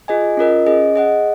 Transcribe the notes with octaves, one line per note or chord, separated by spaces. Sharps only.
F4 G#4 D#5 G#5
C#4 F4 A#4 D#5
C#4 G#4 D#5
G#4 D#5 F#5